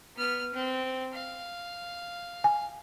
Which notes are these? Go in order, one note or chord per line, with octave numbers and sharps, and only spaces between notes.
B3 F6
C4
F5
G#5